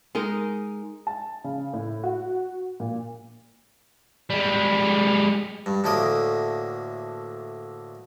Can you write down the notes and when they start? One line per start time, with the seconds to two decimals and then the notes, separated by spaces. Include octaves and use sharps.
0.15 G#3 D#4 A#4
1.07 A5
1.44 C#3
1.73 A2
2.04 F#4
2.80 A#2
4.30 G3 G#3
5.66 G2
5.84 D2 A2 D3 A#3 D#5